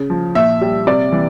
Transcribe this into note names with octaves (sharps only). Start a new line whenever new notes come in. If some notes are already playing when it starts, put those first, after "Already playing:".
Already playing: C#3
F3
A#2 E5
G3
C3 D5
E3